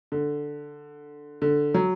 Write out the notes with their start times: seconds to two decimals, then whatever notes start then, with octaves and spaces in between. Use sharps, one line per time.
0.12 D3
1.42 D3
1.74 F#3